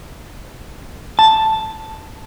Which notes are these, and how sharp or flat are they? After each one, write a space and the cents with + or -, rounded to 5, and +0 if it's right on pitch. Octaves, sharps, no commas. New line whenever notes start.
A5 +0